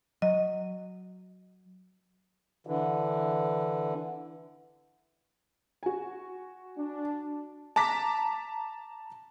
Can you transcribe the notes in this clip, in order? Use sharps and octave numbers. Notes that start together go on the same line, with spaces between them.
F#3 D#5
D3 E3
F#4 G#5
D4
A5 A#5 D6 B6